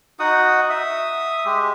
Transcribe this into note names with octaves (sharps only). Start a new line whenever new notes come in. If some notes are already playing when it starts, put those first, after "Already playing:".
D#4 F#4 F#5 D#6
E5 D#6
G#3 G4